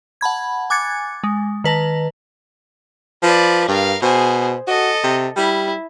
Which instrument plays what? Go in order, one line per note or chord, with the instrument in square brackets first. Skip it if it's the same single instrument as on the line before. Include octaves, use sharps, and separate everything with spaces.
[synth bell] F#5 A5 B5 G#6
G#5 D6 F#6 G#6 A6 C#7
G#3
D#3 B4 A5 A#6
[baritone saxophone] F3 [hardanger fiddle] B4 D5
[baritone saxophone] G2 [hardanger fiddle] A#4 F5
[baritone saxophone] B2 [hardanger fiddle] G#4 C5
[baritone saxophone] F#4 [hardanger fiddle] A4 D#5
[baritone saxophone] C3
[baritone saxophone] G3 [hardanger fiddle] E4